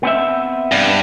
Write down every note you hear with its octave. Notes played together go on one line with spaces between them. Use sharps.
B3 C4 E5
G2